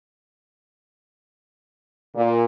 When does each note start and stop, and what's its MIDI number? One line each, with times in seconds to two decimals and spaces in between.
2.14 2.44 46